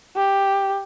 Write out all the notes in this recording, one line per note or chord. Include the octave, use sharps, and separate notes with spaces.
G4